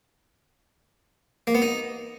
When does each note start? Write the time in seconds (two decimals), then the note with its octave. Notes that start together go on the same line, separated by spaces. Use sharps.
1.47 A#3
1.55 B3
1.62 D#4